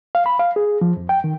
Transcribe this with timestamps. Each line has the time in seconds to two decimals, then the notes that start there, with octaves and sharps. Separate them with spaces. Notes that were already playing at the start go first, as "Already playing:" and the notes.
0.15 F5
0.26 B5
0.39 F5
0.56 G#4
0.81 F3
0.97 F2
1.09 G5
1.24 D#3